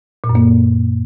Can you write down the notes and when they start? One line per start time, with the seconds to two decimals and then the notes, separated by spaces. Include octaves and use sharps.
0.24 A#2
0.29 F#2
0.35 A#3